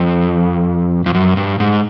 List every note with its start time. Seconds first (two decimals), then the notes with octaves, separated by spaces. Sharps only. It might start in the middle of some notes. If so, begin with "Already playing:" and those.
Already playing: F2
1.06 F2
1.15 F#2
1.37 G2
1.60 G#2